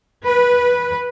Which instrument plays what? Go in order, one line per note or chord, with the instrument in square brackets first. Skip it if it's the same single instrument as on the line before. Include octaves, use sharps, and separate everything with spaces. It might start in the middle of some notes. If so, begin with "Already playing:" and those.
[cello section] B4